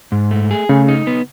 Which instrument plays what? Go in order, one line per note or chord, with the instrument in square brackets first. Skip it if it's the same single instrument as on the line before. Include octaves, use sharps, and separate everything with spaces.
[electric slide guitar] G#2
A3
G#4
[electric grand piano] C#3 [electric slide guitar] A3
[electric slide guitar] D#4
B3